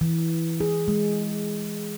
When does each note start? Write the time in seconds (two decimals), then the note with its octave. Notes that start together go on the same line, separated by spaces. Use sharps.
0.01 E3
0.60 G#4
0.88 G#3